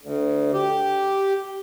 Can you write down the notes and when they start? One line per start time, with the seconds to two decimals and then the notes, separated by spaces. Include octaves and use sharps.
0.02 D2
0.54 G4